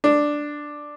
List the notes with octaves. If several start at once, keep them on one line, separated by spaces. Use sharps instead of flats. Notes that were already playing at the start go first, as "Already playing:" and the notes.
D4